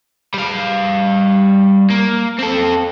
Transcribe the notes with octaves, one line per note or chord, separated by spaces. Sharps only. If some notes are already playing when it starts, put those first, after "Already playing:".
G3 F5
A#3
C4 A4